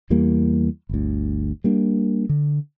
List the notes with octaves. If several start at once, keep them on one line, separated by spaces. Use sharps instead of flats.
E2 E3 G3 A#3
G1 D2
G3 A#3 D4
D3